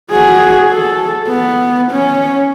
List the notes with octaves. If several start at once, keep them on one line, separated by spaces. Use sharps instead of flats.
F#4 G#4
A4
B3
C#4